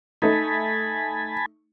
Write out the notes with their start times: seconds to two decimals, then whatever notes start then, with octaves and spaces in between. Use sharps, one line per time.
0.22 A3 D#4 G#5 A5 B5